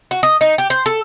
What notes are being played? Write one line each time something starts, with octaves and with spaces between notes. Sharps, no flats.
F#4
D#5
D#4
G4
C5
A4